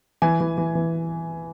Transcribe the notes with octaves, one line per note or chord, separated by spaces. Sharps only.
E3 G#5
E3
E3
E3